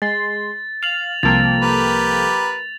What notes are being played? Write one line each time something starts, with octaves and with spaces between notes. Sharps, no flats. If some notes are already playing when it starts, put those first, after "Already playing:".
G#3 C6 A6
F5 F7 F#7
C2 F3 A#3 A4 G5 A6 F7
G4 A#4 B4